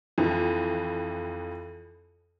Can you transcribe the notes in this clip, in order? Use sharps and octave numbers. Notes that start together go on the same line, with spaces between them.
F2 E3